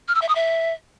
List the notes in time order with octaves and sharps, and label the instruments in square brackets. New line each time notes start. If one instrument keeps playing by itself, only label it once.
[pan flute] F6
E6
E5
D#6
E5